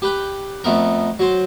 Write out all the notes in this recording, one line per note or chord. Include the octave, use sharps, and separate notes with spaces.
G4 B4 G5
F2 A3 B3 A#4
F#3 C5